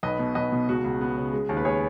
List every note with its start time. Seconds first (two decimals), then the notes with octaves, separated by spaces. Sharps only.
0.03 B1 B4 D#5
0.19 B2
0.35 B1 B4 D#5
0.52 B2
0.68 C#2 F#4
0.84 C#2
1.01 B3
1.17 C#3
1.33 G#3
1.49 D#2
1.57 B4
1.65 G#3 G#4 C#5